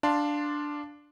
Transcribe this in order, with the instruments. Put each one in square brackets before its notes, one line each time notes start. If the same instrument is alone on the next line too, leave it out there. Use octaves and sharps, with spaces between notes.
[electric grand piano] D4 F5 A5 C6